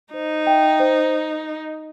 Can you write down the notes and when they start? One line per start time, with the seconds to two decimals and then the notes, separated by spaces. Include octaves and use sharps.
0.13 D#4 C5
0.46 E5 G5
0.80 C5